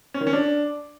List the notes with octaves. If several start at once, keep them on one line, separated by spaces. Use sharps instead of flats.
C#4
D#3
C#4
D4